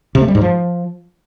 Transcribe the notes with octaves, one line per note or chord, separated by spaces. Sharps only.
C3
A3
G3
G#2
F3